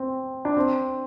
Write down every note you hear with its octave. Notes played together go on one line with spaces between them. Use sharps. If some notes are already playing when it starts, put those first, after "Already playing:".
Already playing: C4
D4
C4